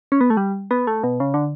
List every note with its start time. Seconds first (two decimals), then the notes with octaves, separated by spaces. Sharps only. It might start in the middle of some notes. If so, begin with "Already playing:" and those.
0.12 C#4
0.21 B3
0.30 A3
0.37 G3
0.71 B3
0.87 A3
1.04 B2
1.20 C#3
1.34 D3